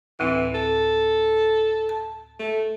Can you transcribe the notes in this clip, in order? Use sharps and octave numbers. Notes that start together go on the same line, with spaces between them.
D2 A2 E3 C4
A4
A5
A3